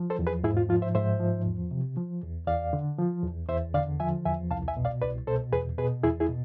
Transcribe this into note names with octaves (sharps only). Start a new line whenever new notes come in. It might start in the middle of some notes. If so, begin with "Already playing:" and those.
Already playing: F3
A4 C5
E2
G#4 B4
G#2 E4 G#4
F4
F3 F4
C5 E5
G#2 C5 E5
F3
E2
C3
F3
E2
E2 D5 F5
D3
F3
E2
E2 C5 E5
D3 D5 F5
F3 E5 G#5
E2 E5 G#5
C2 F5 A5
E5 G#5
B2
D5 F5
C2 B4 D5
B2 A4 C5
E2 G#4 B4
B2 G#4 B4
E2 E4 G#4
E4 G#4
B2